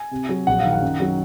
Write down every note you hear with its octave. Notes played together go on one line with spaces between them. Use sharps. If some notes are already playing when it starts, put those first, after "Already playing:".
Already playing: G#5
C3
F#3
A#1 F#5
D#3 F5
F#5
F#2
F#3